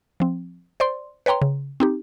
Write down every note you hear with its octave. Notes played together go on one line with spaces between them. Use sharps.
F3 C4
C5 D5 C6
B4 C#5 G5 A#5 C6
C#3
C4 D#4 G4